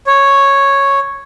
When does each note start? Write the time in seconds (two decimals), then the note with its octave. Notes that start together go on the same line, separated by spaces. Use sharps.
0.07 C#5